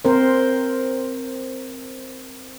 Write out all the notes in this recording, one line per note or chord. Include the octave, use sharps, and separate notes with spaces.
C4 A#4 C5